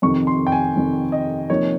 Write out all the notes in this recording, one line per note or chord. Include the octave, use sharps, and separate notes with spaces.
F2 C3 D#3 C#6
C6
G5
G#5
F2 C3 D#3
D#5
C3 F3 A#3 D#4 C#5